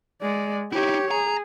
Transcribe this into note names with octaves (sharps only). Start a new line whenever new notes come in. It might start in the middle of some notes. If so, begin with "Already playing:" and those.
G#3 D5
D#4 E4 G4 C#5
G#4 A#5